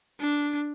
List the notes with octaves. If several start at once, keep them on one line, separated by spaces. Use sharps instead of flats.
D4